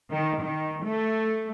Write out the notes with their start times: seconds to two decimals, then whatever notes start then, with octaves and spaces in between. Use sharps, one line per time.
0.11 D#3
0.41 D#3
0.83 A3